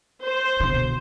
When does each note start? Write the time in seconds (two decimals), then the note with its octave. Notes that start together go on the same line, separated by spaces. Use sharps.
0.23 C5
0.60 B2 D3